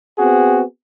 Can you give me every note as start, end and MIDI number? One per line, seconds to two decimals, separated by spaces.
0.19 0.63 59
0.19 0.63 60
0.19 0.63 66
0.19 0.63 68